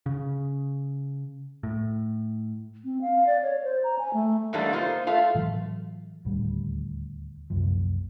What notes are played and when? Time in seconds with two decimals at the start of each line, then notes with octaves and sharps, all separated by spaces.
0.06 C#3
1.63 A2
2.85 C4
3.01 F5
3.27 D5
3.43 C#5
3.64 C5
3.84 A#5
3.99 G#5
4.13 A3
4.53 G#2 E3 G3 A3 A#3 D4
4.72 A#3 D#4 F4 C5
5.07 A3 F4 F5
5.35 A2 E3 F#3 G#3
6.25 D#1 D2 A2 G3
7.50 C2 F#2 A#2 F3